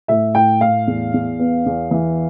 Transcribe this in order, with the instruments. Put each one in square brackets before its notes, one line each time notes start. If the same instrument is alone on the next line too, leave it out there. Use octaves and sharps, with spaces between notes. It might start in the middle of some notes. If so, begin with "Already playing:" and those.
[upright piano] A2 E5
A2 G5
A2 F5
E2
E2
B3
E2
E3